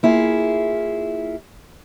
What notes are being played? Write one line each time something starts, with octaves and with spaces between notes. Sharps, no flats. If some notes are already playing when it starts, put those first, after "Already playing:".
A#3 E4 F4 G#4